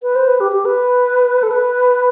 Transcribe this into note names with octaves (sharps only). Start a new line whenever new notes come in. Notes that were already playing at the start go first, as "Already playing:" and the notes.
B4
C5
B4
G4
G4
B4
A4
B4